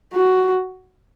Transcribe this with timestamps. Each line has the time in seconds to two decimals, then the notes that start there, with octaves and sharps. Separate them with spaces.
0.13 F#4